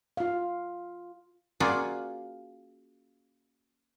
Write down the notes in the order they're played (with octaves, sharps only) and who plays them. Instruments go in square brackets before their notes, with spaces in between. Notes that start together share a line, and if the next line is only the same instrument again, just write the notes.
[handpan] F4 F5
[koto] A#3 C#4 F4 F#4 G#4 D5